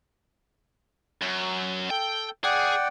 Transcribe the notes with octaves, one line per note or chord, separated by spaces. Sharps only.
F#2
A4 G5
G#4 D5 F#5 G5